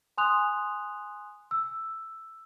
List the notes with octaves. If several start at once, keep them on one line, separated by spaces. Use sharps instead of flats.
G#5 C6 D#6 F#6 F7
E6